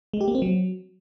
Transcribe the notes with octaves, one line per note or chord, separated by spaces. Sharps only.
G#3
G4
A#3
C4
F#3